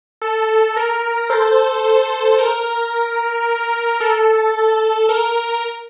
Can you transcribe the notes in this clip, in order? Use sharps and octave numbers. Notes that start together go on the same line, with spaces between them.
A4
A#4
A4 C5
A#4
A4
A#4